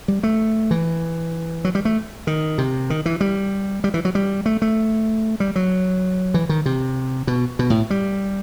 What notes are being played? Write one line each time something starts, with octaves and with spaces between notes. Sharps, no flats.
G3
A3
E3
F#3
G3
A3
D#3
C3
D#3
E3
G3
G3
E3
F#3
G3
A3
A3
G3
F#3
E3
D#3
C3
B2
B2
A2
G3